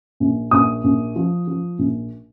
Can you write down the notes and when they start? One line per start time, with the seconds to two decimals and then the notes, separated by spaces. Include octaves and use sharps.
0.20 A#1
0.51 A#1 D#6
0.84 A#1
1.16 F3
1.48 F3
1.79 A#1